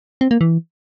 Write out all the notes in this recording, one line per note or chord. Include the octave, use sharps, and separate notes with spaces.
C4
A#3
E3